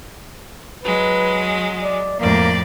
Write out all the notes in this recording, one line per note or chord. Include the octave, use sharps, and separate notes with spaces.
F#3 G#3 B4
D5
F2 A2 A#3 D5